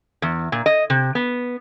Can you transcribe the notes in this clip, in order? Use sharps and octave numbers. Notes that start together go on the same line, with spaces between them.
E2
A#2
D#5
C3
B3